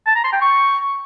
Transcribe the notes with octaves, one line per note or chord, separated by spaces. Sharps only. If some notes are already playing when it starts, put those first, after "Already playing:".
A5
A#5
C6
G5
C#6